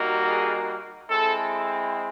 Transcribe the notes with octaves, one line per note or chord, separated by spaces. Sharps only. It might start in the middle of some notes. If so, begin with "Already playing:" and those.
Already playing: G3 A#3 D#4 F#4
G#4
G#3 C4 E4 A4